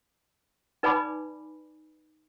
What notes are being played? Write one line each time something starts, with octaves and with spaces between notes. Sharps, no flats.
D#4 B4 D5 G#5 B5 D6